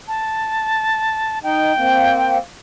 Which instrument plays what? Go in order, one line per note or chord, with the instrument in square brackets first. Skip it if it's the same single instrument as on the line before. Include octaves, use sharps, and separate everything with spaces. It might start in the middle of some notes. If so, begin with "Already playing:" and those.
[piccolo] A5
[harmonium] D#4 [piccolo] G5
[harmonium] A#3 C4